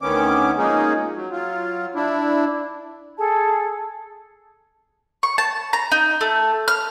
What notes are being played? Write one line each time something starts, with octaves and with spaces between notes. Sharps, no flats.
D2 D#3 B3 C#4 D6
F3 G#3 A#3 C#4 D#4 G#4
F#3
F#3 F4
D4 E4
G#4 A4 A5
C#6
A5
A#5
D#4
A3
F6